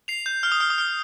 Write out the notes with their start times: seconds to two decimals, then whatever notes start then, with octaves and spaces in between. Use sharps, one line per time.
0.08 C7 F7
0.26 G6
0.43 F6
0.52 D#6
0.60 F6
0.70 D#6
0.78 F6